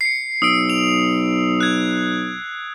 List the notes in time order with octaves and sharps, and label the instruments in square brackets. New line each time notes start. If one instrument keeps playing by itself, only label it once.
[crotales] C7 C#7
[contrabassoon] B1 [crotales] D#6 E6 D7
[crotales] F7
F#6 G#6